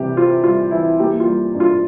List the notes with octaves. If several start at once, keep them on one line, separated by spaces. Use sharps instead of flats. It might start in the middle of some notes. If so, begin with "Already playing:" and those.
Already playing: C3 E3 G3 G4
C4 F4
G3 F4
E3 E4
A#3 G4
F4
G3
G2
F4